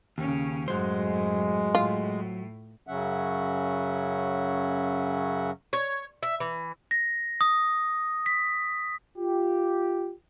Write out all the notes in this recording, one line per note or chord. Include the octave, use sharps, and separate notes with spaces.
D#2 C#3 C#4
F#2 A2 F#3 G#3 C5
A2 F4
F#2 C#3 F#3 C#4 E5 F#5
C#5
E5
E3
A#6
D#6
B6
F4 G4